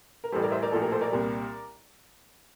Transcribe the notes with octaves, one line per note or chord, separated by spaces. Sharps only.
A#4
A1 A2 E3 G3 A4 C5
A#4 D5
C5 E5
A#4 D5
A#1 A2 F3 A4
G4 A#4
A4 C5
A#4 D5
C2 A#2 G3